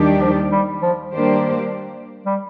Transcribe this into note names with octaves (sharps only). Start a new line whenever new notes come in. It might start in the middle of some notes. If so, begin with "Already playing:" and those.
Already playing: D#2 D#3 G3 D4 G4
F3
G3
F3
D#3 G3 A#3 D4 G4 C5
G3